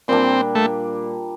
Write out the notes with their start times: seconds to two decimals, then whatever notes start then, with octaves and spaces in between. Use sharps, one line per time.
0.08 A#2 G3 A#3 C4 D4
0.55 A3